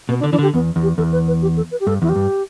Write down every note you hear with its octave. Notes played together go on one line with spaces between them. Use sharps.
B2 B3
D4
D3
E3 D4
D3 G4
E2 B3
E2
G4
E2 A4
B4
B4
G4
A4
B4
G4
G2 A4
E2 E4
G4
G2